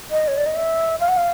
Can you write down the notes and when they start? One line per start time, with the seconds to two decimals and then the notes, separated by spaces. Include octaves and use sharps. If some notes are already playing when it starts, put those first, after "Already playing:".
0.11 D#5
0.28 C#5
0.37 D5
0.46 D#5
0.55 E5
1.00 F5
1.08 F#5
1.17 F5